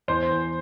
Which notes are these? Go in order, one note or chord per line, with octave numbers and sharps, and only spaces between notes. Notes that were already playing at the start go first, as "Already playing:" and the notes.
E2 C5
E2